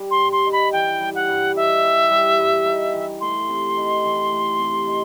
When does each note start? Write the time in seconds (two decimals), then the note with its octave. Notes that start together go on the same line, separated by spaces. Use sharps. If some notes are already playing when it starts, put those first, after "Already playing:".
Already playing: G3
0.11 C6
0.18 G2
0.32 C6
0.46 D#4
0.52 B5
0.72 E3 G5
1.01 G3
1.15 F#5
1.28 G2
1.56 D#4 E5
1.84 E3
2.11 G3
2.39 G2
2.66 D#4
2.93 E3
3.21 A3 C6
3.49 C3
3.77 D#4
4.04 E3
4.32 A3
4.59 C3
4.87 D#4